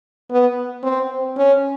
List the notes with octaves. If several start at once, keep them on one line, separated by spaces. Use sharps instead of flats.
B3
C4
C#4